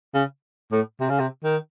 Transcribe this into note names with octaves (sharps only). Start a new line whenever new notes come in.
C#3
A2
C3
C#3
C3
D#3